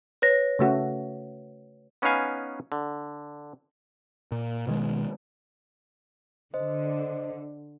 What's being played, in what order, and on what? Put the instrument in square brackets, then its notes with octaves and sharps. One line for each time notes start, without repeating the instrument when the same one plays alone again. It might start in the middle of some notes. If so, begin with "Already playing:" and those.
[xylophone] B4 C#5 A#6
[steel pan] C#3 A3 F#4
[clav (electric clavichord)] B3 C#4 D#4 B4 F5 G#5
D3
[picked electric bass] A#2
B2 D#3 F#3 G#3
[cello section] D3 [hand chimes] C5 D#5